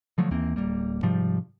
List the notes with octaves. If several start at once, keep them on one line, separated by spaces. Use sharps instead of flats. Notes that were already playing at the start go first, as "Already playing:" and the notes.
D3 F3 F#3 A3
D#2 E3 A#3 C4
D1 D#2 G3 A#3
G#2 C3 F3 G3